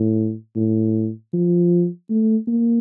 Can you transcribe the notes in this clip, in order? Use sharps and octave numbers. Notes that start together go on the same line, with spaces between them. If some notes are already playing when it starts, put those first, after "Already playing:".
Already playing: A2
A2
F3
A3
A#3